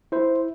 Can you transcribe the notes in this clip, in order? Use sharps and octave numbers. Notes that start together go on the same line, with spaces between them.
E4 C5